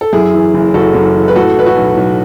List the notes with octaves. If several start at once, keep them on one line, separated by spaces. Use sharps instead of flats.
A4
F#2 E4 G#4
E3
F#1
F#1 F#4 A4
F#2
E3
B4
A2 F#4 A4
E3 B4
F#4 A4
B1
B1